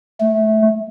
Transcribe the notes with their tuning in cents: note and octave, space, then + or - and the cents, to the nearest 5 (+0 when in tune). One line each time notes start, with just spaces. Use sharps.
A3 -15